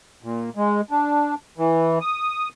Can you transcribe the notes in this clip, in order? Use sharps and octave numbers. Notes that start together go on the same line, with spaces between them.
A#2
G#3
D4
E3
D#6